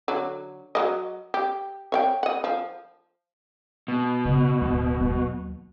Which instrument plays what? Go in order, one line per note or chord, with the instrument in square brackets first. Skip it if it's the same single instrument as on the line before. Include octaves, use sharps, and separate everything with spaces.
[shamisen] D3 F#3
F#3 A#3 D#5
G4
C#5 F5 G5
D#5 F#5
F3
[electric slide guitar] B2
[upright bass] F#2 C#3
D1 F3
D#2 F#3